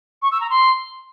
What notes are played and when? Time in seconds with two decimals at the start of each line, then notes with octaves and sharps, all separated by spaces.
0.22 C#6
0.31 E6
0.41 A#5
0.50 C6